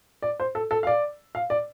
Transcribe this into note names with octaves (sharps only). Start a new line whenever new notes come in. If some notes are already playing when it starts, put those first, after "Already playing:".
D5
C5
A4
A4
F5
D5
F5
D5